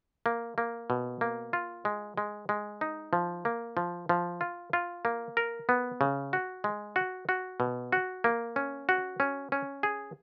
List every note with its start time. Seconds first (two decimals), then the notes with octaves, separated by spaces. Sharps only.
0.26 A#3
0.58 A#3
0.90 B2
1.21 A#3
1.53 F4
1.85 G#3
2.17 G#3
2.49 G#3
2.81 D#4
3.13 F3
3.45 A#3
3.77 F3
4.09 F3
4.41 F4
4.73 F4
5.05 A#3
5.37 A#4
5.69 B3
6.01 C#3
6.33 F#4
6.64 G#3
6.96 F#4
7.29 F#4
7.60 B2
7.92 F#4
8.24 A#3
8.56 C#4
8.89 F#4
9.20 C#4
9.52 C#4
9.83 G#4